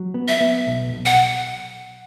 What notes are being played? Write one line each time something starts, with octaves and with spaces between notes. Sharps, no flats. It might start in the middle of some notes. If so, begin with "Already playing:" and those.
Already playing: F#3
B3
E5
B3
B1
B1
F#5